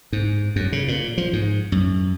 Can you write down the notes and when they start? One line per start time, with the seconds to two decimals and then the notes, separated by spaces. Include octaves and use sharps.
0.13 G#2
0.56 F#2
0.72 C#3
0.88 A#2
1.18 F3
1.33 G#2
1.72 F#2